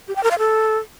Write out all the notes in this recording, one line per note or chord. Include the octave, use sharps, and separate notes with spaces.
G4
G5
A#4
F5
A4